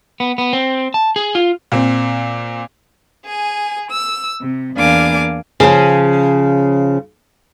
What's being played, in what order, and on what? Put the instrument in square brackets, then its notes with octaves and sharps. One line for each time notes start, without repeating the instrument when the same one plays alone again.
[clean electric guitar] B3
B3
C4
A5
G#4
F4
[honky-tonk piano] A#2 C4
[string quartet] G#4 G#5
E6
C3
E2 A#3 D4 F5 G#5 D6
[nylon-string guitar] C#3 F3 C#4